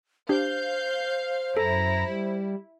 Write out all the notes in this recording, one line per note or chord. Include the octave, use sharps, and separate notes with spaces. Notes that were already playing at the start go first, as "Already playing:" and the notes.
D4 G4 C5 F5 G6
F#2 E4 A4 A#5
G3